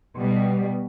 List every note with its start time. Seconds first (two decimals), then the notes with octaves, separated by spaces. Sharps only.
0.18 B2 G3